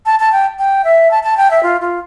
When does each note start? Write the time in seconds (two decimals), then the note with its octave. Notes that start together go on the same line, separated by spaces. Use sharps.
0.06 A5
0.20 A5
0.32 G5
0.59 G5
0.84 E5
1.11 A5
1.23 A5
1.37 G5
1.51 E5
1.63 F4
1.81 F4